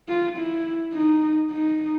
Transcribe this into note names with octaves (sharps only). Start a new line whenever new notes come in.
F4
E4
D#4
D#4